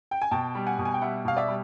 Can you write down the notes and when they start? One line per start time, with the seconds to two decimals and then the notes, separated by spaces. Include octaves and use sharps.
0.11 G5
0.22 G#5
0.31 B2 G5 A5
0.55 G3
0.66 F#5 G#5
0.79 B2
0.85 G#5
0.94 G5
1.02 G3 E5 F#5
1.25 B2 F5
1.37 D5 E5
1.48 G3